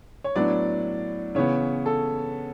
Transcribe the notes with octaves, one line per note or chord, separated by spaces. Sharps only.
C#5
A2 F#3 B3 D4 D5
C#3 E3 B3 C#5
A4